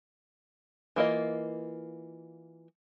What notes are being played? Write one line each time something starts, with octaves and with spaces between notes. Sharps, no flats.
E3 A#3 F4 D#5